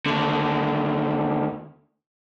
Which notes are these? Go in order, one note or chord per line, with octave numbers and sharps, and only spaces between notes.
D#2 D3